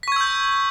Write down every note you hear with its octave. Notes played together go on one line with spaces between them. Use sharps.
C#6 E6 G6 G#6 B6